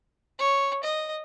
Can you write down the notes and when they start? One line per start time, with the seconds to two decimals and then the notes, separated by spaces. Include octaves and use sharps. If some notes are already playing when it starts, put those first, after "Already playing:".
0.39 C#5
0.83 D#5